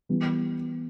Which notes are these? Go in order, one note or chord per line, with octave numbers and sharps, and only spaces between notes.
E3 G3 B3